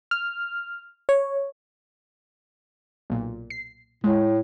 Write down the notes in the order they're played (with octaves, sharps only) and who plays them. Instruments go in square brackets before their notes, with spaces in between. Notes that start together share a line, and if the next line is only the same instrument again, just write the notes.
[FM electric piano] F6
C#5
[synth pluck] B1 A#2
C7
[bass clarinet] A2 [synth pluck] G#3